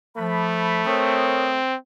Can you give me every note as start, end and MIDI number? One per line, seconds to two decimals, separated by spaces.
0.17 0.83 53
0.17 1.59 57
0.17 0.83 83
0.87 1.76 60
0.87 1.47 70
0.87 1.47 73
0.87 1.47 87